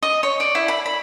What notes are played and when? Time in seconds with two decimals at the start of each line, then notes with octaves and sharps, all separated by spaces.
0.03 D#5
0.23 C#5
0.40 D5
0.55 E4
0.68 B5
0.86 B5